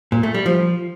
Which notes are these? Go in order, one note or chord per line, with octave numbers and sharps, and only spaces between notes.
A#2
A3
G3
F3